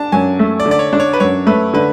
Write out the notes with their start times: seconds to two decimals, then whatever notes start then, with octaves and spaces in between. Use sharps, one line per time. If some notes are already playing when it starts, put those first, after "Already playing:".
Already playing: D4 A5
0.12 F#2 G#5
0.39 A3
0.60 D5
0.66 D3
0.71 D5
0.79 C#5
0.93 D4
1.00 C#5
1.13 B4
1.20 F#2 C#5
1.47 A3 B4
1.74 D3 B4